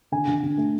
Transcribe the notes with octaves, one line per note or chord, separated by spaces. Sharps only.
D3 G#5
D3
D3
A3